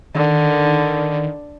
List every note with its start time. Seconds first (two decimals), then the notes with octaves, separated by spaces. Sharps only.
0.15 D3 D#3